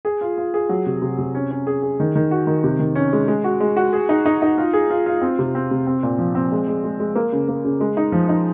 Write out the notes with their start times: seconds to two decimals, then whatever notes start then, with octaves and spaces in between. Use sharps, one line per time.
0.05 G#4
0.21 F4
0.38 F4
0.54 G#4
0.69 F#3
0.86 C3
1.02 C3
1.18 C3
1.35 C#4
1.51 C#4
1.67 G#4
1.83 G#4
2.00 D#3
2.15 D#3
2.31 F#4
2.47 D#3
2.64 C3
2.79 D#3
2.95 C#4
3.13 G#3
3.28 G#3
3.44 F#4
3.60 G#3
3.77 F#4
3.93 G#4
4.09 D#4
4.26 D#4
4.42 D#4
4.58 F4
4.73 G#4
4.90 F4
5.06 F4
5.22 C4
5.39 C3
5.55 C4
5.71 C3
5.87 C4
6.03 A#2
6.19 F3
6.35 C4
6.52 G#3
6.68 G#3
6.84 G#3
7.00 G#3
7.15 A#3
7.33 C#3
7.48 A#3
7.65 C#3
7.81 G#3
7.97 D#4
8.12 F3
8.29 D#4